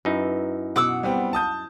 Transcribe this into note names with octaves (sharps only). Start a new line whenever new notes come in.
F#2 D#4 E4 B4
B2 F#5 D6 E6
G3 B3 C4
A5 D#6 G6